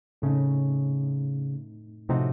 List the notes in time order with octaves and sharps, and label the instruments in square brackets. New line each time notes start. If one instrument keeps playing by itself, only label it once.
[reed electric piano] A2 A3 C4 D#4 [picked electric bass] C#3
[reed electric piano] A2 F3 C4 D#4 F#4 [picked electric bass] C3